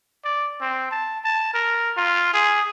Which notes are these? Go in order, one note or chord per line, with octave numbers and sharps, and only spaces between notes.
D5
C4
A5
A5
A#4
F4
G#4